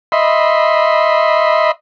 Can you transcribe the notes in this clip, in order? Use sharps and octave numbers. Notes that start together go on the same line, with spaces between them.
D#5 E5 B5 C6